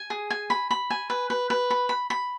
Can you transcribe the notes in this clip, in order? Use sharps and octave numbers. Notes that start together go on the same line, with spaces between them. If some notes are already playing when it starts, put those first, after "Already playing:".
Already playing: G#5
G#4
G#5
B5
B5
G#5
B4
B4
B4
B5
B5
B5